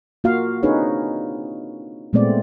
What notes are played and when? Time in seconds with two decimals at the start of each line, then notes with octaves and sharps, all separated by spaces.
0.24 A#3 F4 F#4 F5
0.63 C4 D4 D#4 G#4 B4 C#5
2.13 A#2 G#3 A3 B3 C4 D5